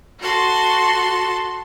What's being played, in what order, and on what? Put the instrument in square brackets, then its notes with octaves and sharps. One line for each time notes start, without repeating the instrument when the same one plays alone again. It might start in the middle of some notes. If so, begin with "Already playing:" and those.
[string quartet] F#4 A4 C6